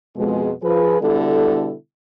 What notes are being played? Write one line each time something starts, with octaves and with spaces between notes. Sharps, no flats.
F2 B2 G#3
F3 G#4 B4
B2 D3 G3 E4 A4